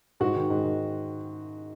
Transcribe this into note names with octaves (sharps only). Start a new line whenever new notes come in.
G#2 F#4
D#3
G#2
D#3